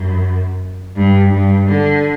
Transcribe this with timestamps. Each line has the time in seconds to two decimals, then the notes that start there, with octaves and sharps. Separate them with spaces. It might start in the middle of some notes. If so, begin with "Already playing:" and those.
Already playing: F#2
0.96 G2
1.32 G2
1.67 D3